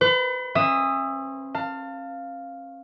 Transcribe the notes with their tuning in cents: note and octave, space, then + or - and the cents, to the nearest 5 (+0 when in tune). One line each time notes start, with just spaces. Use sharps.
B4 +40 B5 -20
C#4 -40 E5 +15 D#6 +0
F5 +0 A5 +30